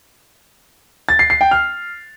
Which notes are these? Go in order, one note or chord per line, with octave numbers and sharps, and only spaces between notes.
A6
C7
C7
G5
F6